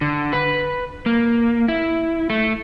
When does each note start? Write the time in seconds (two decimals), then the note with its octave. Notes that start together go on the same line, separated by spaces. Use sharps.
0.01 D3
0.33 B4
1.06 A#3
1.68 E4
2.30 A3